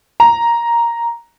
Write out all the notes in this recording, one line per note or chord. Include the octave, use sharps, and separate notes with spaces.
A#5